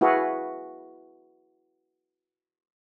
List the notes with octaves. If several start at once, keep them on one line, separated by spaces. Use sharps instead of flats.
E4 F#4 G#4 B4 F5